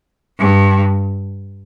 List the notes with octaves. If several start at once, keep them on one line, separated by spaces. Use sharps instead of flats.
G2